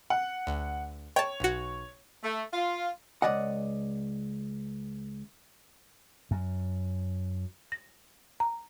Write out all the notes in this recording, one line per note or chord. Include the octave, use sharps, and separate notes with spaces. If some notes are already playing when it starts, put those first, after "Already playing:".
F#5
D2
C#5 G5 A5
B1 F#4
A3
F4
C#2 G2 D5 D#5 F#5
F#2
A#6
A#5